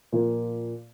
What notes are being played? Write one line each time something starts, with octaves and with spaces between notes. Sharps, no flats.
A#2 F3 A#3